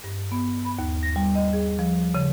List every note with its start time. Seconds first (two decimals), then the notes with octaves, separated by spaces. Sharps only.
0.04 G2
0.32 B3
0.65 B5
0.78 D#2
1.03 A#6
1.16 G3
1.35 D#5
1.53 G#4
1.79 F3
2.14 C#3